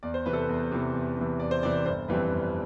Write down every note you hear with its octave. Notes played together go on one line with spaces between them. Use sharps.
E2 D5
C5
C3 E3 B4
A4
B4
E2
C3 E3
E2
C3 E3
E2 D5
C5
C3 E3 D5
G1 C5
F2 E3 G3 C4 B4
G1